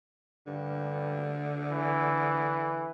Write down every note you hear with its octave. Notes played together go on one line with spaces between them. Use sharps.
G2 D3
E3